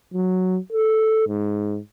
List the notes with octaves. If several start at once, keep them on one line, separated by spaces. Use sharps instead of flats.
F#3
A4
G#2